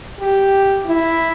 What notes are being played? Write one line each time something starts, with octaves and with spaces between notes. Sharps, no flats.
G4
E4